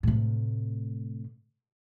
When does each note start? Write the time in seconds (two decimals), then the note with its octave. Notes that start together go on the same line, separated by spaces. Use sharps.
0.03 A2 C3